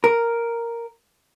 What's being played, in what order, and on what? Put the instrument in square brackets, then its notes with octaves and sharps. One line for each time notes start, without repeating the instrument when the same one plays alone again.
[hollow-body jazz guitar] A#4